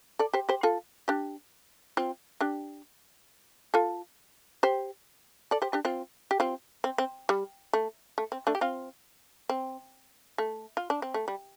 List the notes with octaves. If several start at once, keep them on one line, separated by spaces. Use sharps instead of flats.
A4 D5
G4 C5
G4 C5
F4 A4
D4 G4
C4 F4
D4 G4
F4 A4
G4 C5
A4 D5
G4 C5
D4 G4
C4 F4
G4
C4 F4
C4
C4
G3
A3
A3
C4
A3 D4
G4
C4 F4
C4
A3
F4
D4
C4
A3
G3